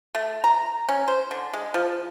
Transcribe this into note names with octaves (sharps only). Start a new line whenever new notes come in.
A3
A#5
C#4
C5
D3
G#3
F3